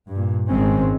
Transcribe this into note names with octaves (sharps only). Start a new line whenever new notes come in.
G2 A#2
G#1 G#2 D#3 G#3 C4 C#4